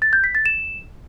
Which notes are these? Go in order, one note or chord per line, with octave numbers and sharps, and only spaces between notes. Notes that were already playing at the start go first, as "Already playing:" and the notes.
A6
G6
B6
A6
E7